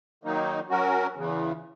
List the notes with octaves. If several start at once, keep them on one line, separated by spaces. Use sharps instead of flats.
D#3 F#3 A#3 D#4
F#3 C#4 F#4 A#4
E2 C#3 E3